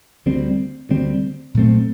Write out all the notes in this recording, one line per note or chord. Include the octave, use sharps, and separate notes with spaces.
D2 D3 G3 C4
D2 D3 G3 C4
A#2 F#3 A3 C4